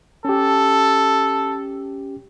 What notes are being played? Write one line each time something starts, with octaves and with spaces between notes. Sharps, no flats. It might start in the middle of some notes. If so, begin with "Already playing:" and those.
C#4 G4 A4